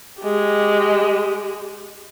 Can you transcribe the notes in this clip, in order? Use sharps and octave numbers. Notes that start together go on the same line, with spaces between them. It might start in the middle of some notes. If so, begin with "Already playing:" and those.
G#3 G4